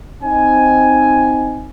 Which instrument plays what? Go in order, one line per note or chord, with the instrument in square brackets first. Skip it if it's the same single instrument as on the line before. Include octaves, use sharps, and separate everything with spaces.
[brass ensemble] C4 D#4 G#5